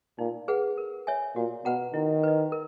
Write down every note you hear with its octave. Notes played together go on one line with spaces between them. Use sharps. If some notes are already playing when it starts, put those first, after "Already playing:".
A#2 D#4
G#4 B4 F#5
A#4
C#5 E5 G#5
A#2 F#4
B2 B4 F#5 A#5
D#3 E4
B4 D#5
A#4